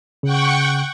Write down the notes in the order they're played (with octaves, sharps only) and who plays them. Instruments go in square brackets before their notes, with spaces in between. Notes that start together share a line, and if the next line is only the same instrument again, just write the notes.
[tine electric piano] C#3 [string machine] F#5 G5 C#6